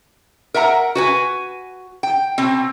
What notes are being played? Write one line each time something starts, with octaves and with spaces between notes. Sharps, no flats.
A#4 E5 F#5 A#5
F#4 B4 G#5
G5
B2 C4